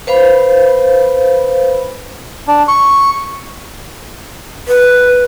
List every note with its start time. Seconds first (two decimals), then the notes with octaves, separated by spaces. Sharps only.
0.07 B4 C5 F5 B5
2.48 D4
2.68 C#6
4.68 B4